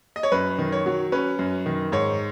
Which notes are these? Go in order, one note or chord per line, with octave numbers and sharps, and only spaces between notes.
D#5
C#5
F#2 B4
D#3
C#5
F#3
C#4 B4
F#2
D#3
G#2 C#5